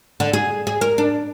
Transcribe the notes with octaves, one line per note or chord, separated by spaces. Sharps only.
D3
G#4
G#4
A#4
D4